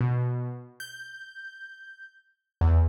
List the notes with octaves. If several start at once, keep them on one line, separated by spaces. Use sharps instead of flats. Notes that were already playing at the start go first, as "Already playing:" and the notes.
B2
G6
E2